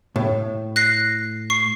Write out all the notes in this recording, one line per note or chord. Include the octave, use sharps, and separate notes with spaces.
A2
F#6 A#6 C7
C#6 C7